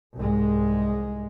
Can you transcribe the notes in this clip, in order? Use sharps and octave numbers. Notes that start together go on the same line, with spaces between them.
C2 G#2 G#3